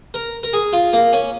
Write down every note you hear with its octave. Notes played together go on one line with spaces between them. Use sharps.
A#4
A#4
G#4
F4
A#3
C#4